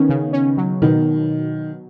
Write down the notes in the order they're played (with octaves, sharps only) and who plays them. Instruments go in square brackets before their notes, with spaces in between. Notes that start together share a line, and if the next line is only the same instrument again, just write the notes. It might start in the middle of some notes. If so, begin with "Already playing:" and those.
Already playing: [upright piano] D#3 [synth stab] B3 C#4
[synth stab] C#3
C#4
F#3
[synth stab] B2 [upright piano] D#3